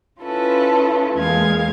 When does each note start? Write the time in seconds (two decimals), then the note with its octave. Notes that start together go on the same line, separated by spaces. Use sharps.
0.21 C#4 E4 F4 A4 B4
1.15 E2 A#2 G#3 F5 G#6